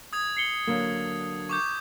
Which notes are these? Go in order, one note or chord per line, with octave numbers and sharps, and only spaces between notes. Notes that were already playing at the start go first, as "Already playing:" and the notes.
D#6 G#6 F7
C7 C#7 G7
D3 F#3 A#3
C#6 D6 G6